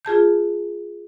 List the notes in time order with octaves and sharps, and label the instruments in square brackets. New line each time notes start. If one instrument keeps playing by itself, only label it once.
[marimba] F4 G#4 A5 G6